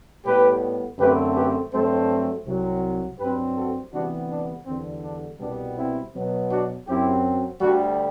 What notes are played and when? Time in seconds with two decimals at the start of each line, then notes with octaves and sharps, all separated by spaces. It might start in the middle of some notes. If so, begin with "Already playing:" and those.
0.25 A2 G3 B3 G4 B4
0.98 F#2 D3 A3 C4 G4 B4
1.35 G4 B4
1.71 G2 F#3 A3 C4 A4 C5
2.45 C2 C3 F#3
3.19 G2 F#3 C4 G4 B4
3.56 F#4 A4
3.92 D2 C3 E3 G3 B3 D4 F#4
4.30 D4
4.66 E2 D3 G3 C4
5.03 D4
5.40 C2 B2 G3 B3 D4
5.77 C4 E4
6.14 B2 F#3 B3
6.50 D4 F#4
6.87 F#2 F#3 C4 E4 G4
7.60 D2 D3 G3 D4 F#4